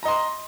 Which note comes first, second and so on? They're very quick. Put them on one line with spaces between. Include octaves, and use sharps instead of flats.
A#5 D#5 C6